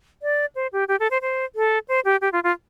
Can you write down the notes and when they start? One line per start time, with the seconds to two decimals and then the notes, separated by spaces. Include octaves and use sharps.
0.22 D5
0.55 C5
0.73 G4
0.88 G4
1.00 A4
1.11 C5
1.22 C5
1.55 A4
1.88 C5
2.05 G4
2.21 G4
2.32 F4
2.44 F4